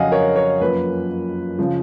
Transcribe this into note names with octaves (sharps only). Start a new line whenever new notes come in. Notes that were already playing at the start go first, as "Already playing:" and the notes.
Already playing: F2 C#3 F#3 D#5 F5 F#5 G#5
A#4 C#5
A#4 C#5
F#2 F3 A#3 B4
C#3 F3